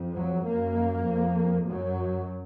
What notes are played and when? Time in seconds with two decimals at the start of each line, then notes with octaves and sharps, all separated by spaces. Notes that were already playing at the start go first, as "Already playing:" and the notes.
Already playing: F2
0.15 F#3
0.45 F#2 A#3
1.07 F2
1.68 F#2 F#3